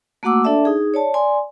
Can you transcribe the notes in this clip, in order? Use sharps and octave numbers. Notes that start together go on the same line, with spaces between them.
A3 A#3 F#4 F#5 D6 E6
D4 A4 D5 E5 A5
D#4 G#4
C#5 D5 A5
D5 G#5 C6